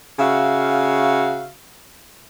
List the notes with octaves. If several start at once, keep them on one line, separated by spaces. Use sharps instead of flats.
C#3 F#4 E5 F5